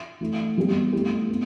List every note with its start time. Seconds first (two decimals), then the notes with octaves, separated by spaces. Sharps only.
0.21 E3 A3 E4
0.57 E3 G3 B3 G4
0.93 A3 E4 G4
1.30 B3